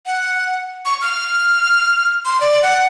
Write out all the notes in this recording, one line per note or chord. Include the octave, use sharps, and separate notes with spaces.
F#5
C#6
F6
C6
D5
F#5